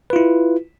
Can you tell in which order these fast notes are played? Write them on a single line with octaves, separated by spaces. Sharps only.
B4 F4 E4